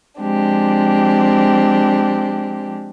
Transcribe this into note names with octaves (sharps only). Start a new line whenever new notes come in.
F3 G#3 C4 D4 G4